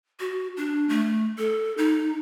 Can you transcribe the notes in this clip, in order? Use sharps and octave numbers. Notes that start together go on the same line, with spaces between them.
F#4
D4
A3
A4
D#4